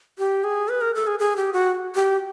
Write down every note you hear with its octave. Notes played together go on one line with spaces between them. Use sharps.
G4
G#4
B4
A#4
A4
G#4
G#4
G4
F#4
G4